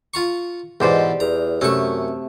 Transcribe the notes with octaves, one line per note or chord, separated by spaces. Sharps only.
F4 A#5 C#6
E2 G#2 B2 G#3 G4 C5 D5
E2 A#5
F#2 C3 A3 C#4 C#6